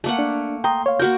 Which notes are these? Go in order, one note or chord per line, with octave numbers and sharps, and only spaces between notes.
A3 A#3 F#5
D4
G5 A#5 C6 D#6
C#5 F5
A#3 F#4 A#4 G6